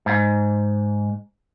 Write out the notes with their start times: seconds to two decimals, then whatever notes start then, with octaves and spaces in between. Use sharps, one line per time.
0.06 G#2